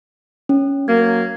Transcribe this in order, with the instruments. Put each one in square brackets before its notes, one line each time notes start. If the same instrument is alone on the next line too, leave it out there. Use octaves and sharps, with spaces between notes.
[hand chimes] C#4
[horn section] F#3 A#3 [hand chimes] G#6